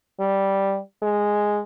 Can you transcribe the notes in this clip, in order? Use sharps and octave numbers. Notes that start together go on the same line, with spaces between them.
G3
G#3